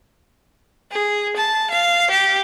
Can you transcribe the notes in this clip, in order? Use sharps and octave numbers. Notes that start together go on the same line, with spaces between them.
G#4
A5
F5
G4